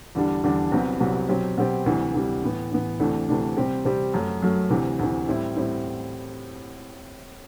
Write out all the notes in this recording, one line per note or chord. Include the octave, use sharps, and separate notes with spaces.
E2 D3 G3 D4
E2 D3 G3 D4
C2 C3 F#3 B3
C2 C3 F#3 B3
B2 F#3 C4 G4
B2 F#3 C4 G4
D2 C3 E3 G3
D2 C3 E3 G3
A2 E3 B3
A2 E3 B3
D2 C3 E3 A3 D4
D2 C3 E3 A3 D4
C3 G3 C4 G4
C3 G3 C4 G4
F#2 F#3 A3
F#2 F#3 A3
D2 C3 E3
D2 C3 E3
A2 G3 C4 E4
A2 G3 C4 E4